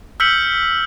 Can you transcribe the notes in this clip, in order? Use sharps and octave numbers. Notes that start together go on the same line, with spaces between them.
E6 F6 G6 B6 C#7 F#7